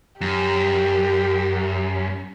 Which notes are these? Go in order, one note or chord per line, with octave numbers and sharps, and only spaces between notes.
F#2 G4